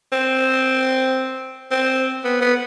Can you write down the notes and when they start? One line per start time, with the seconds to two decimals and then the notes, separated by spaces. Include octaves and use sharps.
0.12 C4
1.71 C4
2.24 B3
2.41 B3